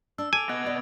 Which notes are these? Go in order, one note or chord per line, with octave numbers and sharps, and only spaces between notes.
D4 E6
A4 G#5 D6 D7 F7
B3 D#5 D#6 F#6 G#6
D5